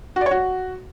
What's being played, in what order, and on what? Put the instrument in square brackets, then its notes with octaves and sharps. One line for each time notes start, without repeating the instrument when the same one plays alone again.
[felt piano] F#4
D5
C#5
F#4